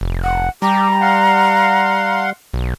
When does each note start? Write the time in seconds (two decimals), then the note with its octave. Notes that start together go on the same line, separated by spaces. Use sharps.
0.01 F1
0.23 F#5
0.62 G3 G4 A#5
1.01 F5 F#5 C6
2.54 B1